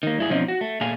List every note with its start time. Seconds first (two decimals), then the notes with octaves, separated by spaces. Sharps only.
0.03 D#3 A#3
0.18 G2 E4 G#4
0.30 B2 F3 C4 C#4 D#4 F4
0.48 F#4
0.61 A3
0.81 A#2 A3 G#4 F5 G#5